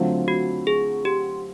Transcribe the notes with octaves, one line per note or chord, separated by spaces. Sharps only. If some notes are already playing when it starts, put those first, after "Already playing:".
Already playing: D3 F#3 A3 C4 F4
F#4
G#4
G4